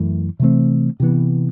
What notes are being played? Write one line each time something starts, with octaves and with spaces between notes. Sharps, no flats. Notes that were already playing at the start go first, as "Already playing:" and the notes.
Already playing: F#2 E3 A3
C3 E3 A3 C4
C3 E3 B3